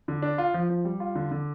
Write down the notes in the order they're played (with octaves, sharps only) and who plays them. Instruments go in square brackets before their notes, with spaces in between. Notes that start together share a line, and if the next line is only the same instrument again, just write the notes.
[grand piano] D3
D4
F4
F3
F3
G3
F4
D3
D3